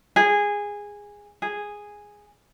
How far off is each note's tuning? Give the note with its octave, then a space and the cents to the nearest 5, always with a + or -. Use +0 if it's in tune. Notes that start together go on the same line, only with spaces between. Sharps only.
G#4 -15
G#4 -5